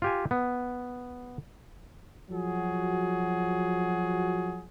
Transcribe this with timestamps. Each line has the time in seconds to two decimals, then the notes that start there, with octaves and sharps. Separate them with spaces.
0.02 F4 G4 G#5
0.31 B3
2.30 F3 F#3 F#4 G#4